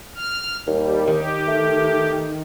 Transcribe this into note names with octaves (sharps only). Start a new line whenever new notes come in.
F6
D#2 G3
D#3 G4
A3